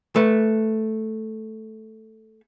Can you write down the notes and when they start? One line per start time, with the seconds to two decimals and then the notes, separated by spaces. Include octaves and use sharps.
0.16 A3 B4